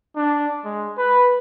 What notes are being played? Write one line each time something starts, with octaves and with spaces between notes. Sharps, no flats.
D4
G#3
B4